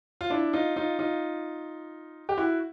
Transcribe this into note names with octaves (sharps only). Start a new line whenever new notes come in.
F4
D4 E4
D#4 F4
D#4 F4
D#4 F4
G4
E4 F#4